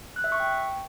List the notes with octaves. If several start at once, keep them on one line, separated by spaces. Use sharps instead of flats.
F#6
E5
C#6
G5